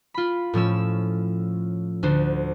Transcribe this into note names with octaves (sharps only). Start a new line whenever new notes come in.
F4 B5
A2 F3 C#4 E6
D2 D3 C5